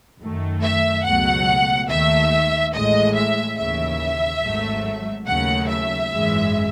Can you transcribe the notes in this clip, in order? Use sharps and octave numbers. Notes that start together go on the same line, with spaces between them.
F#2 D#3 A3
E5
C#2 B2 F#3 A3 F#5
D#2 D#3 A3 E5
A1 A2 G#3 D#5
E5
D#2 C#3 E3 E5
G#1 G#2 F#3 A3
D#2 C#3 F#3 A3 F#5
E5
G#1 F#2 E3 G#3